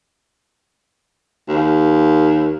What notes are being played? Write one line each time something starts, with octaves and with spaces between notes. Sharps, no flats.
D#2